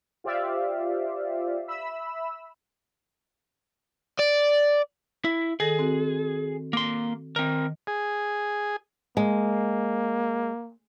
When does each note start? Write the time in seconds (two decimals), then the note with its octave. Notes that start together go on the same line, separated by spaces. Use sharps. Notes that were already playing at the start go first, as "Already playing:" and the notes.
0.24 F4 G4 C5 D5 E5 F5
1.68 E5 B5 E6
4.19 D5
5.25 E4
5.60 D#3 G#4 A4 A#6
5.79 C4 F#4
6.73 A#3 C6
7.36 D#3 C4 A#4
7.87 G#4
9.17 G#3 A#3